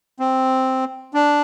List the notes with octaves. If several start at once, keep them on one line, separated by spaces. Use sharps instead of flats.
C4
D4